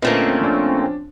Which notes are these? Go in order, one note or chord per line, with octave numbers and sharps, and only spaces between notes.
A#2 D3 A3 A#3 C4 C#4 B4 D#5
F3 D4